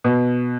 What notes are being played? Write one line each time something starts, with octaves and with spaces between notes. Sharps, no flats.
B2